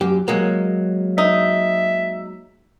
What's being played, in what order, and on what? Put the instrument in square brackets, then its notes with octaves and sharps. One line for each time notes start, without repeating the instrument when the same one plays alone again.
[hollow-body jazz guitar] F#2 G4
F#3 G#3 A#3
[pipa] D#4 [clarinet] E5